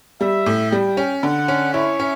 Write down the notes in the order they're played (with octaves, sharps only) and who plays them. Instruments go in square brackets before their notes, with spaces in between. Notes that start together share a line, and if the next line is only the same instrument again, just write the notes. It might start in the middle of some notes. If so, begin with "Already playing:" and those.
[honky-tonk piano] G3 [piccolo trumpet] E5
[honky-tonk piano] A2
[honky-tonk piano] G3 [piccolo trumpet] G5
[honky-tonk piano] C#4
[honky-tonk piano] D3 [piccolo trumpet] F#5
[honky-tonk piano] C#4
[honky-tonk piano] E4 [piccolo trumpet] C#5
[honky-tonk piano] C#4